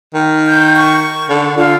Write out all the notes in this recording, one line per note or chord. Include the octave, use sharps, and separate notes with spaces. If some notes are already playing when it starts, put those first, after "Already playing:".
D#3
G6
C#6
D3
D3 F4